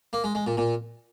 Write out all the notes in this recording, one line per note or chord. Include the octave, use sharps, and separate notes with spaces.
A#3
G#3
G#3
A#2
A#2